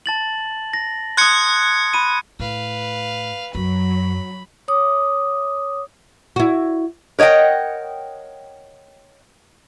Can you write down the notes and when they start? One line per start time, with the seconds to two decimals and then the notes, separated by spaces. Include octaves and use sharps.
0.06 A5 A6 F#7
0.73 A#6
1.17 C6 D#6 F#6 G#6 C#7
1.94 B5 D#7
2.40 A2 B4 F5
3.55 F#2 F#3 B5
4.68 C#5 D6 D#6
6.36 E4 F#4
7.19 A#4 C#5 D#5 F#5 G5